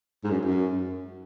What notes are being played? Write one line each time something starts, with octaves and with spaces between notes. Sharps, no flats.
G#2
F#2
F#2